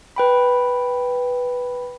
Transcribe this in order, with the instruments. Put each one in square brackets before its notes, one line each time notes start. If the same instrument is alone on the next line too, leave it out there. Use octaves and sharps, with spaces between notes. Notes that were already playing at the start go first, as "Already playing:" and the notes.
[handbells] B4 G5 B5